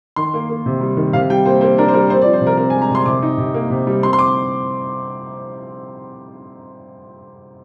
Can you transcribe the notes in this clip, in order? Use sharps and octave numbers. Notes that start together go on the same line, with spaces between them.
D#3 C6
A#3
A#3
C3
G3
D#3
C3 F5
G3 G5
A#3 C5
A#3 C5
D4 A#4
C5
G3 A#4
C4 C5
D5
F3
C5
C3
A#4
C4 A#4
G#5
G#3
A#5
C3
C6
C3 D6
D#4
C3
A#3
C3
G3
C4 C6
C6
D6